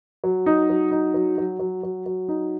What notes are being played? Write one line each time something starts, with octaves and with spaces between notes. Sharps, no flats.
F#3
D#4
F#3
D#4
F#3
F#3
F#3
F#3
F#3
D#4